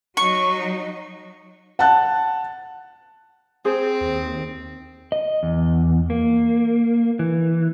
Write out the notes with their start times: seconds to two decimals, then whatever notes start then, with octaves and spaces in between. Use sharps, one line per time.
0.17 F#3 D#4 C#6
1.79 F#5 A5 F#6
3.65 C4 G#4 C5
4.01 D#2
5.12 D#5
5.43 E2
6.10 A#3
7.19 E3